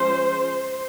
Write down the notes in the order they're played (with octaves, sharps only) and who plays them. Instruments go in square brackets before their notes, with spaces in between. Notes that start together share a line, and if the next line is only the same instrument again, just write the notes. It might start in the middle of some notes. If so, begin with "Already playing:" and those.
Already playing: [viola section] F3 G#3 C#4 C5